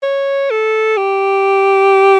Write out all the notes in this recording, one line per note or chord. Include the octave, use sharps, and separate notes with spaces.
C#5
A4
G4